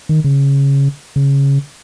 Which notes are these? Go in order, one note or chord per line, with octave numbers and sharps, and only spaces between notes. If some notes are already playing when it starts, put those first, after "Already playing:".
D#3
C#3
C#3